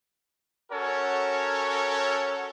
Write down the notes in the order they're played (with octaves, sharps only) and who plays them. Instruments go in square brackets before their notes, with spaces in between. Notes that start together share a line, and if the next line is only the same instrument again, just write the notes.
[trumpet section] C#4 F#4 A4 A#4 C#5